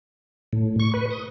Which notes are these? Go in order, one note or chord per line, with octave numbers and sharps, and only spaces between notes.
A2
C#6
B4
D#6